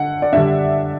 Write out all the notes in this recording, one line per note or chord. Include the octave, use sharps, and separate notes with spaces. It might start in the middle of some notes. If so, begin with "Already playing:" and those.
Already playing: D3 F#5
D5
D3 G3 D4 E5